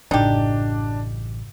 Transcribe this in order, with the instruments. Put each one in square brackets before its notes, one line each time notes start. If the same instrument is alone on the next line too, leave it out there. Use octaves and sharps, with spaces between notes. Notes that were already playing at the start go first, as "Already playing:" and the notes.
[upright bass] A1 [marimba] F#2 A2 C#3 [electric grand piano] D4 [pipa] D#4 G4